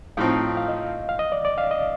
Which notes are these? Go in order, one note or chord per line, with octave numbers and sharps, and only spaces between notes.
A2 F3 C4 D#4 F5
F5
D#5
F5
D#5
D5
D5
F5
D#5